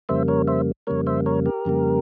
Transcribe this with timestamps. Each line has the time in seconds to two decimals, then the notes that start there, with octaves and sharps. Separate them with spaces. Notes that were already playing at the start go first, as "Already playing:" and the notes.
0.09 F2 C#3 G3 A#3 C5 E5
0.28 A#4 C#5
0.47 C5 E5
0.87 F2 C#3 G3 A#3 A#4 C#5
1.07 C5 E5
1.26 A#4 C#5
1.46 G4 A#4
1.65 F2 C#3 G3 A#3